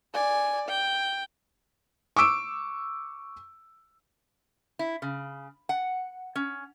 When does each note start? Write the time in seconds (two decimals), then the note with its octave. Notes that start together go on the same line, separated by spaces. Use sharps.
0.14 D5 G#5
0.69 G5
2.16 C#6 D6 E6 D7
4.79 E4
5.02 C#3
5.69 F#5
6.36 C#4